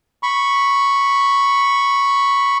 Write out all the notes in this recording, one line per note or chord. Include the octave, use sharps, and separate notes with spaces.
B5 C#6